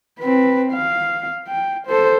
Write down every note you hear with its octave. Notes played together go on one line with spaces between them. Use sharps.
C4 B4
F5
G5
A4 C5